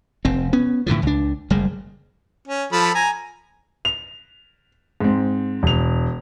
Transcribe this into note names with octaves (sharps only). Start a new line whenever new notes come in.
F1 C4
B3 C#4
A2 D3 E3 F3
C#2 D4
F#1 G3 G#3
C#4
F3 A4 B5
G#5 A#5
F7
G#2 C4
E1 F7